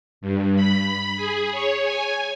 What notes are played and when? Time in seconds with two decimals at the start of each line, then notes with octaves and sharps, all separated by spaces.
0.21 G2
0.56 B5
1.16 G#4
1.52 C#5
1.84 G#5